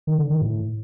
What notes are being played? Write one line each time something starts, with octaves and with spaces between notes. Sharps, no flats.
D#3
D3
D#3
A2